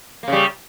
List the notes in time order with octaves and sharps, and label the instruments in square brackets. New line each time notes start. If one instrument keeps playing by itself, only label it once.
[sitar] A#3
C#3
G3